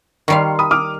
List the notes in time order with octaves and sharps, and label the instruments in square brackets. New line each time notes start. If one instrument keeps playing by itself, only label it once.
[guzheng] D#3 G3 F5 [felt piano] C6 C#6
[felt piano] B5 D#6
D6 D#6 F6